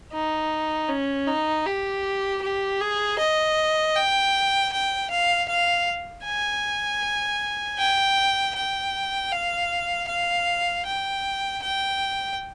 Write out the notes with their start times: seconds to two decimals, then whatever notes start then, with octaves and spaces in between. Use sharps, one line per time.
0.13 D#4
0.89 C#4
1.27 D#4
1.66 G4
2.42 G4
2.80 G#4
3.19 D#5
3.96 G5
4.72 G5
5.10 F5
5.49 F5
6.25 G#5
7.79 G5
8.55 G5
9.32 F5
10.08 F5
10.86 G5
11.62 G5